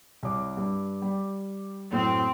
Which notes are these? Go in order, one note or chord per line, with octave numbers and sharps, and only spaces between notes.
C2 C#5 D6
G2
G3
F#2 A2 C4